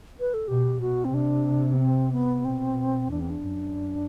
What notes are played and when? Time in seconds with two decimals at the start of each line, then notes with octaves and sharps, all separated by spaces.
0.20 B4
0.34 A4
0.48 B2 G4
0.81 B2 F#4
1.05 C4
1.13 C3 D4
1.73 B3
1.79 C4
2.12 B3
2.45 B2 C4
3.11 E2 D4
3.21 C4
3.30 D4
3.44 F#2